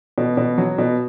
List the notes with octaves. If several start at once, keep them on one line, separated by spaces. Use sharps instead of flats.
B2
B2
F#3
B2